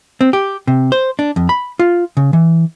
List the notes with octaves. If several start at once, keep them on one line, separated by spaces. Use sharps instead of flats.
C4
G4
C3
C5
D4
F2
B5
F4
C#3
E3